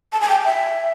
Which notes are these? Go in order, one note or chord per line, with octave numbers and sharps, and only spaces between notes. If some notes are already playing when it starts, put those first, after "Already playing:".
A5
G#5
G5
E5